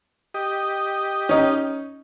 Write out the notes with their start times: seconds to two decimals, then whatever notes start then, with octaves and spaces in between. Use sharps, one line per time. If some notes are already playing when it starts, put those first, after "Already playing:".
0.34 G4 D#5
1.29 C#4 D#4